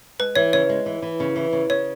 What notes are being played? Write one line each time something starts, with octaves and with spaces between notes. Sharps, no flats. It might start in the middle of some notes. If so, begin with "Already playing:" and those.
G#3 B4
E3 C#5
C#3 C#5
G#3
E3
E3
C#3
E3
C#3
C#3 C#5